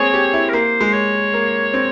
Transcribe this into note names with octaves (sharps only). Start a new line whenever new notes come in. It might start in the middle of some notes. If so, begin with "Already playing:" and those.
Already playing: G#3 A#3 C4 G#4 C#5
G4
E4
A#4
A#3 C5
G#3
C#5
A#3
C4